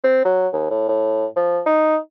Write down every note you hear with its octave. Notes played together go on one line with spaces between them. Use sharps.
C4
F#3
D#2
A2
A2
F3
D#4